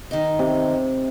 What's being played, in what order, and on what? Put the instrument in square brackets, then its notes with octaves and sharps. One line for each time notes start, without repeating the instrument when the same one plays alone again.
[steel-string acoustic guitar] D#3 D#4
[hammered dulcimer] C3